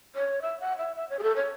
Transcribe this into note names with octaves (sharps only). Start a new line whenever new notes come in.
C#5
E5
F#5
E5
E5
C#5
G#4
A4
C#5